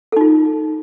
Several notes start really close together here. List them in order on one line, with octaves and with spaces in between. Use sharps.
A4 D#4 F4